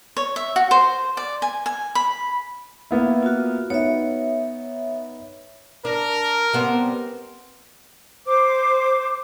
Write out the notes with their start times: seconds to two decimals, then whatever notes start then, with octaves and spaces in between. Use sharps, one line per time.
0.17 C#5
0.36 E5
0.56 F#4
0.71 C5
1.17 D5
1.42 G#5
1.66 G#5
1.95 B5
2.91 A#3 B3 E4
3.23 F4 F#4
3.70 B3 D#4 C#5 E5
5.85 D4 A#4
6.53 G3 B3 C4
8.26 C5 D6